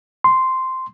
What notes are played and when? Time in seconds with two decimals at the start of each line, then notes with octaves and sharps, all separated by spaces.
0.24 C6